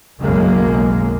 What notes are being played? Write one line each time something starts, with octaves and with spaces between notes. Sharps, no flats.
F#1 B1 F#2 C#3 G#3 A#3